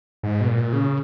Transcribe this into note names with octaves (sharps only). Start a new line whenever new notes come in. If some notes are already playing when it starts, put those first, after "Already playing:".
G#2
B2
A#2
C#3